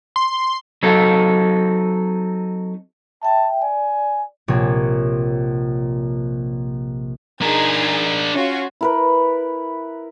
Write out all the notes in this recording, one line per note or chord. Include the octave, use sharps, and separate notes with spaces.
C6
F#3 C4 D#4 A4
E5 G5 A5
D5 G#5
A#1 C3 C#5
D4 D#4 G#4 A#4 G#6
C#4 F4 F#4
E4 A#4 B4